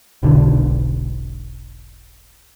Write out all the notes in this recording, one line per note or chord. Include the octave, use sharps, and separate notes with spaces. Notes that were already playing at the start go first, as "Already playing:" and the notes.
E1 B1 D3